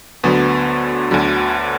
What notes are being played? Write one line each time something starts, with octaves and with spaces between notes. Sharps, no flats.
D2 D3 F#3 B3
D2 D3 F#3